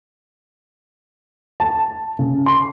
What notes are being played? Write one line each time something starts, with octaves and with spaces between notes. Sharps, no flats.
A5
C#3
C6